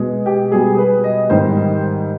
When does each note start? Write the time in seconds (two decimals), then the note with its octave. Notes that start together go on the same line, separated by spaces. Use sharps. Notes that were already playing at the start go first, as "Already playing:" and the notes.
Already playing: B2 G#3
0.26 G4
0.52 B2 G3 G#4
0.74 G#4
0.78 B4
1.04 D#5
1.30 G#2 D#3 G3 C5